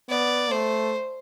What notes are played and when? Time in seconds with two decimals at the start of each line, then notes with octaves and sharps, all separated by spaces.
0.09 B3 D5
0.51 A3 C5